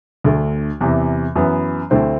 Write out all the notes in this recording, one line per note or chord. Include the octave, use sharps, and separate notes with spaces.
D2 D3 A3
E2 C3 E3
F#2 E3 B3
D2 D3 A3 C4 E4